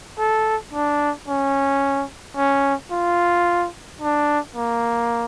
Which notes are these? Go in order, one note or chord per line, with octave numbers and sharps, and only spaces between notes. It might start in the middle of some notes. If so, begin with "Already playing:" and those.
A4
D4
C#4
C#4
F4
D4
A#3